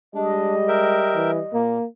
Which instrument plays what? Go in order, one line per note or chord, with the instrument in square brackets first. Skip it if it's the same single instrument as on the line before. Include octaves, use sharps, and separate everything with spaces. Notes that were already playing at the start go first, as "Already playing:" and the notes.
[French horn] G3 [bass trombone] G#3 [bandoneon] D4 [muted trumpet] D#5
[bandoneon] A#4 E5 G5
[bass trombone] E3
[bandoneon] A#2 [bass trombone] A#3